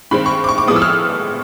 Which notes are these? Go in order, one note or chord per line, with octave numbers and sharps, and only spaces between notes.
G2 D#3 G#3 C4 B5
C#6
D6
C#6
D6
A2 F3 G#3 B3 D#6
E6
F6